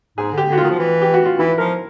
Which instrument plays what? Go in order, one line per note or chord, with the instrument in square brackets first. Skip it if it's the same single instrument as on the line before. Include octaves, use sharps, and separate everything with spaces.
[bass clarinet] G#2 [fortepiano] G#4
[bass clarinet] D3
[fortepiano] G4
[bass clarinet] D3 [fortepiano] F#4
[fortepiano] F4
[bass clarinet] D#3
F3
E3
[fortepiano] G4
F#4
F4
[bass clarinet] E3 [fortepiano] E4
[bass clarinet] F3 [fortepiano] A#4